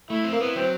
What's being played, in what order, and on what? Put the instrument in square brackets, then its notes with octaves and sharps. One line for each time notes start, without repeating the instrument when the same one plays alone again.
[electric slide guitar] A3 [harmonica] E4
[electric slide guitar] C4
[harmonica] A#3
[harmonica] B3 [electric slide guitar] E4
[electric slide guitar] F#3 [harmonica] C4